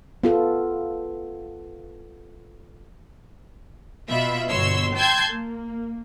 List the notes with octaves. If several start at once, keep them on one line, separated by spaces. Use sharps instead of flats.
B3 F4 A4
B2 F4 E5 B5
G1 B2 C#5 C6 E6
G5 A5 C6 E6 G6 G#6
A#3